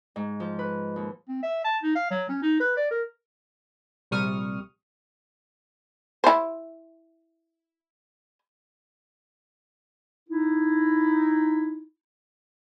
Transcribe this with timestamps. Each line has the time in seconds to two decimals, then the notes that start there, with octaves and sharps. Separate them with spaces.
0.16 G#2
0.40 F3
0.59 B4
0.96 D#2
1.28 C4
1.43 E5
1.64 A5
1.83 D#4
1.95 F5
2.10 F#3
2.29 C#4
2.42 D#4
2.60 B4
2.76 D5
2.91 A#4
4.11 A#1 C3 G3 C#6 D#6 F6
6.24 E4 C5
10.29 D#4 E4